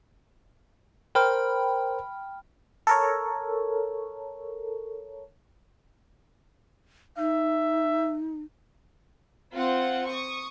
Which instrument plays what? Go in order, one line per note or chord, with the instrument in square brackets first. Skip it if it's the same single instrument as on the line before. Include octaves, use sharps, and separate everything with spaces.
[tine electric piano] A#4 C5 [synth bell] G5 B5 F6
[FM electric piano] A4 A#4 C#5
[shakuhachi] D#4 [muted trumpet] E5
[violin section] C4 F4 F#5
C#6 D#6